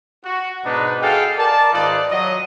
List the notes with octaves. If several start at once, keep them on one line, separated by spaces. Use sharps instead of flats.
F#4
G#2 B2 D4 D#4 B4
F#4 G#4 A4 D#5 F5 G5
A#4 D5 A5
G#2 D#3 D#4 F4 B4 D5
F#3 D#5